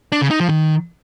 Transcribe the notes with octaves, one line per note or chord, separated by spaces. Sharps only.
D4
C#3
D#4
F3
D#3